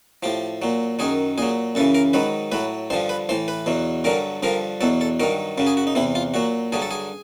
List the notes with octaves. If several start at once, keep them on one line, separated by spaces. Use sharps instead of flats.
A2 F3 G4
A#2 F#3
F#2 D#3 F#3 G#4
A#2 F#3 G#4
F#2 C#3 E3 A4
A#4
G#2 D#3 F#3 B4
A2 F#3 B4
G2 D3 F3 C5
B4
A2 E3 C5
B4
E2 B2 F#3
G2 D3 F#3 A#4
G2 D3 F3 A#4
E2 B2 F#3 A4
A4
G2 D#3 F#3 A#4
F#2 C#3 F#3
G#4
F#4
D#4
E2 C3 E3 E4
F4
A#2 F#3 F#4
G2 D3 F#3 G#4
A4
G#4